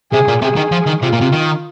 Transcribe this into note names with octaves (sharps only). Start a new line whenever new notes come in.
C3 G#4
A#2
C3 G#4
D#3
F3
D#3
C3 F4
A#2
C3
D#3